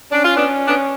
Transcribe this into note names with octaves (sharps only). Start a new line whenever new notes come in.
C#4 D4
F4
B3 D4
B3 D4